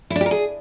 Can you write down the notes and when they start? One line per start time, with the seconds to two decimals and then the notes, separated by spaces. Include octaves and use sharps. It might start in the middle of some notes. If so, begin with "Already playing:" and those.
0.10 E4
0.16 D4
0.21 G4
0.26 A#4
0.31 G#4